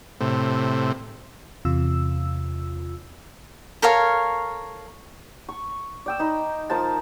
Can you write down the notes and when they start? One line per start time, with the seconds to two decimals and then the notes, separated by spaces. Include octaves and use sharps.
0.20 A2 C3
1.65 E2 C3 F4 E6
3.82 A4 A#4 C#5 F5
5.49 C#6
6.06 D5 G5 E6
6.19 D#4 D#5 B5
6.70 F3 A#4 C5 A5